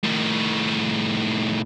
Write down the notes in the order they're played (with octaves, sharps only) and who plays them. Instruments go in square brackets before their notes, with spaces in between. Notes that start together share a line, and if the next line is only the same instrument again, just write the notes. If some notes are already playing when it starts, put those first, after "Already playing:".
[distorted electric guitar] A2 D#3